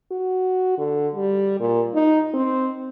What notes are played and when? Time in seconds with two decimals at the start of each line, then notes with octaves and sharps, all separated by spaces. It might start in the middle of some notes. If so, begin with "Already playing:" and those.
0.11 F#4
0.78 D3
1.15 G3
1.60 A#2
1.94 D#4
2.34 C4